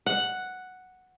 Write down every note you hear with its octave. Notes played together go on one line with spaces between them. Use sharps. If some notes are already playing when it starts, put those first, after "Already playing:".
F#5